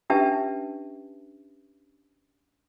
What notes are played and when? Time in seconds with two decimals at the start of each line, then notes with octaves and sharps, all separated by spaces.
0.10 C#4 D4 G4 B4 E5 A5